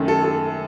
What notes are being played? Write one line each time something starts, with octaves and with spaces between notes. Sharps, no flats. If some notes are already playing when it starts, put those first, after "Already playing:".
Already playing: F#2 D#3 A3
A4
A4